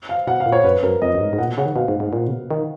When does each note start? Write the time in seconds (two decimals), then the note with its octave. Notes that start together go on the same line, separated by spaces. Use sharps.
0.09 F5
0.27 B2 F#5
0.40 F5
0.46 A#2
0.52 C#5
0.64 F#2 B4
0.83 F#2 A#4
1.02 F2 D#5
1.15 F#2
1.21 G#2
1.33 G#2
1.38 A#2 F#5
1.48 B2
1.57 C#3 F#5
1.66 D#3
1.76 B2 F5
1.88 G#2
2.00 G#2
2.13 A#2
2.28 C#3
2.31 B2
2.51 D#3